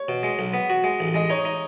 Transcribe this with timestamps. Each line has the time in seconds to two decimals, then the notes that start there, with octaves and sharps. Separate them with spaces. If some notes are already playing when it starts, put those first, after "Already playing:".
Already playing: C#5
0.08 B2
0.23 G#3
0.39 B1
0.54 B3
0.70 F#4
0.84 G#3
1.00 A1
1.14 G#3 D#5
1.30 D#4 C#5
1.45 D#4